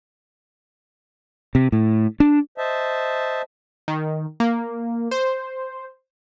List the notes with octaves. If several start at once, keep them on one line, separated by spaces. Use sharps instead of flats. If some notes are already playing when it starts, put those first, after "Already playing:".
C3
A2
D4
C5 D#5 E5 A5
D#3
A#3
C5